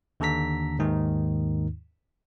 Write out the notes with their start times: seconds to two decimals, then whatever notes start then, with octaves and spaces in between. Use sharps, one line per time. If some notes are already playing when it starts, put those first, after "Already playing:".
0.20 D#2 D3 A4 A#5 B6
0.80 D#2 G#2 D#3 D#4